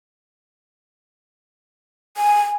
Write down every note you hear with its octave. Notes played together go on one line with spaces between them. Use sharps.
G#5